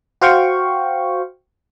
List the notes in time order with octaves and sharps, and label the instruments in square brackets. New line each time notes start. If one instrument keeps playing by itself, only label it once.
[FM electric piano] F#4 C5 F5 G5 C#6